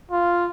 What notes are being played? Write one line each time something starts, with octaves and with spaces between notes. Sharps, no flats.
F4